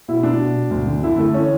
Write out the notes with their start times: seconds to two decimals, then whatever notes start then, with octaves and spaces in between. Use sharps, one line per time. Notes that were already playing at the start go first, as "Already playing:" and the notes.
0.08 B2 E4
0.23 B2 D4
0.40 B2
0.56 B2
0.71 D2
0.88 D3
1.03 D3 E4
1.18 D3 A3
1.34 E3 C#4